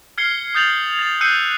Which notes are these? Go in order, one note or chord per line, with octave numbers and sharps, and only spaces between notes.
F6 G#6 C7 C#7 G7
D#6 G6 A6 F7 F#7
A6 F7
E6 F#6 G6 C7 C#7 D#7